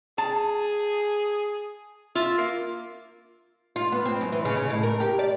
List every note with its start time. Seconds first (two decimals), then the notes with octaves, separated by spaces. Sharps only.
0.18 G#4 A5
2.15 F4 E5
2.38 A#3
3.76 F4
3.92 B3
4.05 C4
4.21 F#2
4.32 E3
4.45 C#3
4.57 C#3
4.70 A2
4.83 A#4
5.00 G4
5.19 D5